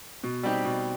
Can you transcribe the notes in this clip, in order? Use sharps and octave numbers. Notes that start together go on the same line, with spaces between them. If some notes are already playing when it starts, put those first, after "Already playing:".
B2
G3 C4 D#4 G4
B2